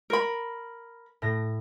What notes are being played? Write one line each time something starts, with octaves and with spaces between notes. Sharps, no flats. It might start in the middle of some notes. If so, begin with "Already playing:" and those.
A#4 B5
A2 A#6